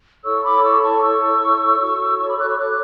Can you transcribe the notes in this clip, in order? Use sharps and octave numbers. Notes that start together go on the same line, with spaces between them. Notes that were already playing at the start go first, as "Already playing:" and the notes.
E4 A4 C#5 C#6 E6
B5 D6
C#6 E6
A5 C#6
C#6 E6
F#4 A4 C#5
C#6 E6
B5 D6
D6 F#6
C#6 E6
D6 F#6